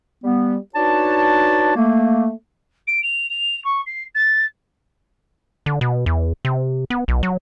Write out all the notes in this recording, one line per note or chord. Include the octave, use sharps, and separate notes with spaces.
G3 B3
D4 D#4 F#4 B4 C#5 A5
A3 A#3
D7
F7
F7
C#6
C7
A6
D3
B2
E2
C3
B3
B1
F#3